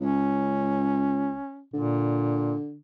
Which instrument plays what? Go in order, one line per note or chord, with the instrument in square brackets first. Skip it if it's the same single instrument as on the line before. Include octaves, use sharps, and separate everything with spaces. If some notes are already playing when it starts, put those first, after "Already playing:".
[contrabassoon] C#2 [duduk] C#4
[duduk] A#2 [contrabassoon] D3